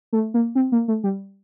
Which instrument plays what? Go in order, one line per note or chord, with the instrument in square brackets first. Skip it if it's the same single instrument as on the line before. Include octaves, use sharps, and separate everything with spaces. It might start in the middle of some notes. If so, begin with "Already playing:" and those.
[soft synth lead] A3
A#3
C4
A#3
A3
G3